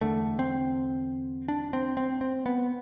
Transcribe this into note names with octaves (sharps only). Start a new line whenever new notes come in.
E2 D3 A3
C4
D4
C4
C4
C4
B3